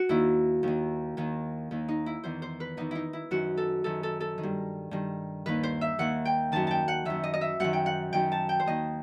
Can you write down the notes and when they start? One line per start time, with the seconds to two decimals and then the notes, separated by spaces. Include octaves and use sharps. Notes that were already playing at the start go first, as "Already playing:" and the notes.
Already playing: F#4
0.09 D#2 D#3 E4
0.63 D#2 D#3
1.17 D#2 D#3
1.71 D#2 D#3
1.88 D#4
2.06 E4
2.24 E2 D#3 C5
2.42 C5
2.60 B4
2.77 E2 D#3 D#4
2.91 D#4 E4
3.13 E4
3.31 F#2 D#3 F#4
3.57 A4
3.84 F#2 D#3 A4
4.03 A4
4.20 A4
4.38 D#3
4.43 G2
4.91 G2 D#3
5.46 D#2 D#3 B4
5.63 C5
5.81 E5
5.99 D#2 D#3 F#5
6.25 G5
6.52 F#2 D#3 A5
6.67 G5 A5
6.88 F#5
7.05 F#2 D#3 E5
7.24 D#5
7.34 D#5
7.41 E5
7.60 F#2 D#3 F#5
7.73 G5
7.86 F#5
8.13 F#2 D#3 G5
8.32 A5
8.49 G5
8.60 C5
8.66 D#2 D#3 D#5